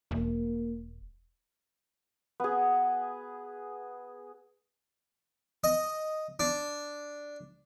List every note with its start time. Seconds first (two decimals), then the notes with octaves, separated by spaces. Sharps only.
0.11 E1 A#3
2.40 B3 G#4
5.64 D#5
6.40 D4